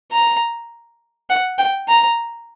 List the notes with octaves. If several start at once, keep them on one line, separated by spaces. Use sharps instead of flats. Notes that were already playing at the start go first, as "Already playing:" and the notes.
A#5
F#5
G5
A#5